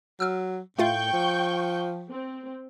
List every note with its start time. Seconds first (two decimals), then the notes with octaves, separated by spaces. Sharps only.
0.20 F#3 E6 F6
0.79 A2 A3 F4 F5 G5 C#6 G6
1.13 F3
2.10 C4